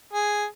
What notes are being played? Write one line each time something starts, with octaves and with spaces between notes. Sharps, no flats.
G#4